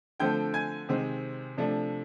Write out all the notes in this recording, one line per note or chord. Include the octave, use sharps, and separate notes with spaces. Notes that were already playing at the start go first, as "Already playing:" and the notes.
D3 F3 A3 C4 G5 G6
G#5 G#6
C3 D#3 G#3 C4
C3 F3 A3 D4